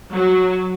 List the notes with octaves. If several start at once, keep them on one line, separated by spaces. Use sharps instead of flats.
F#3